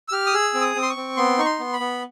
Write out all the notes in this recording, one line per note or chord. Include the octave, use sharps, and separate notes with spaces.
E6
G4 F6
D#6
G#4 E6
C4
D#6
C4
C6
C#6
C4
B3 C6
D#4 C#6
C6
B3
B5
B3